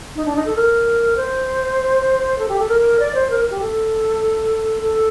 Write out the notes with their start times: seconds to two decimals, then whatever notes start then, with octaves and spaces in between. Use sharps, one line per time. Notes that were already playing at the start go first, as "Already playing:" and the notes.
0.15 D#4
0.25 D4
0.36 D#4
0.45 A4
0.56 A#4
1.16 C5
2.38 A4
2.48 G4
2.59 A4
2.69 A#4
2.99 D5
3.14 C5
3.30 A#4
3.50 G4
3.60 A4
4.82 A4